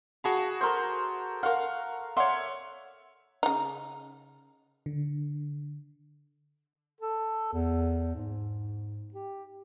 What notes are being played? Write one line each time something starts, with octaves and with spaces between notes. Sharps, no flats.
F#4 G#4 F5 A5 B5 C#6
A4 A#4 C5 E5 C6
A#4 F5 F#5 C6 C#6
C#5 D5 E5 F#5 C6
C#3 D#4
D3
A4
E2
G#2
G4